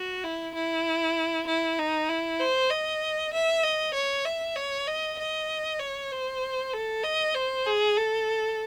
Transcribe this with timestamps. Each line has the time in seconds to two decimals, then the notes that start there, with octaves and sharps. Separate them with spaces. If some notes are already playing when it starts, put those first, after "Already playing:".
Already playing: F#4
0.24 E4
0.55 E4
1.47 E4
1.79 D#4
2.09 E4
2.40 C5
2.71 D#5
3.33 E5
3.64 D#5
3.94 C#5
4.25 E5
4.56 C#5
4.88 D#5
5.19 D#5
5.80 C#5
6.12 C5
6.73 A4
7.04 D#5
7.35 C5
7.66 G#4
7.97 A4